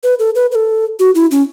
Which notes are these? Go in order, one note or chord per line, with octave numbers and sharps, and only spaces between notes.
B4
A4
B4
B4
A4
F#4
E4
C#4